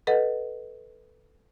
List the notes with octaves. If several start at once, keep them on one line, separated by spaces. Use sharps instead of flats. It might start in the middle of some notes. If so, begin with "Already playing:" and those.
A4 B4 D#5 F#5